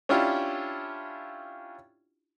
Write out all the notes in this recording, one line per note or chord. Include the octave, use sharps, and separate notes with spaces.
C#4 D4 E4 F4 G4